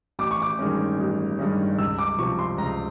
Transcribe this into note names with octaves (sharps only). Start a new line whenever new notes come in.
A1 D6
C#6
D6
G2 D#3 G#3 C#4
A1
G2 D#3 G#3 C#4
C#2 E6
D6
C3 F3 C#6
C6
C#2 A#5